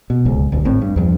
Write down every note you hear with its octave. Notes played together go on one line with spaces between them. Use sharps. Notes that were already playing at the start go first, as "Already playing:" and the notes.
B2
D1 C#2
D#1 D2
G#1 A2 C4
G2
E2 G2 F3